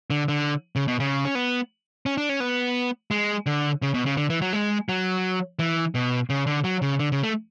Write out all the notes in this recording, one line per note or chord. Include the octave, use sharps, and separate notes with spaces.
D3
D3
C#3
B2
C#3
C#4
B3
C#4
D4
C#4
B3
G#3
D3
C#3
B2
C#3
D3
E3
F#3
G#3
F#3
E3
B2
C#3
D3
F#3
C#3
D3
C#3
A3